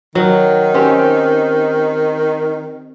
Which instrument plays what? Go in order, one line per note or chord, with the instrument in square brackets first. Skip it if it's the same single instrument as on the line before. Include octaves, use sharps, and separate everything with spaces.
[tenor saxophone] D#3 [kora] F#3
[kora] C4 C#4 G4